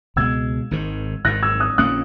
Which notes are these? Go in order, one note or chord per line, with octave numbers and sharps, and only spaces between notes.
C#2 B2 G#3 E6 G#6
G#1 G#2 D#3
G#1 G#2 D#3 F#6 A#6
E6 G#6
D#6 F#6
A#1 A#2 A#3 C#4 D#6 F#6